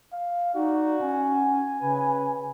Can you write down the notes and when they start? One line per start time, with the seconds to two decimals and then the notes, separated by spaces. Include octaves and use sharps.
0.12 F5
0.55 D#4 F#4 D5
1.01 C#4 G#5
1.82 C#3 B4